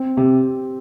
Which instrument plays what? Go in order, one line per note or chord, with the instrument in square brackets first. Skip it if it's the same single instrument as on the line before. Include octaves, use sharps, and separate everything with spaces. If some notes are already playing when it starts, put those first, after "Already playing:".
Already playing: [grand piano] C4
[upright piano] C3 [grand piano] G4